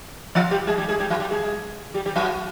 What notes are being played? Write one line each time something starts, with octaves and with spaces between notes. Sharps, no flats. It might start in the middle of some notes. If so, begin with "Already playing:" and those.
F3 F4
G3 G4
G#3 G#4
G3 G4
G#3 G#4
G3 G4
F#3 F#4
G3 G4
G#3 G#4
G3 G4
G3 G4
F#3 F#4